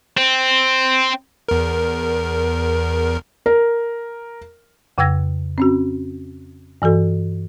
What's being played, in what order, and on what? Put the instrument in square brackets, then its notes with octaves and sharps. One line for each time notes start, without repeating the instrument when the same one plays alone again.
[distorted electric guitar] C4
[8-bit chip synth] E2 A#4
[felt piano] A#4
[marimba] F2 C#3 G5 E6 G#6 A#6
C4 C#4 F#4
G2 E3 F#4 A4